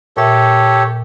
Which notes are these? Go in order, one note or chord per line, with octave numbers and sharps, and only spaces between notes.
A#2 G4 A4 C#5 E5